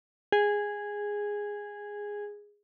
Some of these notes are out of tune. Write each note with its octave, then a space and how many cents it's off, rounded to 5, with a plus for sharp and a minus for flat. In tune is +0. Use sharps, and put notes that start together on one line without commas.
G#4 -10